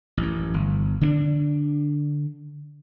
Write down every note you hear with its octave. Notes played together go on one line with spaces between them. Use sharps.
A1 F#2
G1
D3 C4 D4